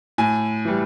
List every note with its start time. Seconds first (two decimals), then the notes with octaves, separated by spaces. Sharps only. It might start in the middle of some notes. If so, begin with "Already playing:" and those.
0.18 A2 G#5
0.65 E3 G3